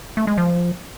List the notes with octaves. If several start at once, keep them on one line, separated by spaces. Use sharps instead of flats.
A3
G#3
F3